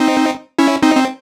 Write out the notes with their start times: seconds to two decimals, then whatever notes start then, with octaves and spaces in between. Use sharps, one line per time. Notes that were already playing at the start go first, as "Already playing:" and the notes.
Already playing: C4 D#4
0.59 C#4 E4
0.82 C4 D#4
0.96 C4